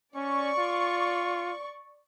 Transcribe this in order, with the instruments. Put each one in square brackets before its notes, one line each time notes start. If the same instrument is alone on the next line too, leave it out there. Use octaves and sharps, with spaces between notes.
[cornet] C#4 [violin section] D5 C#6
[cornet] F4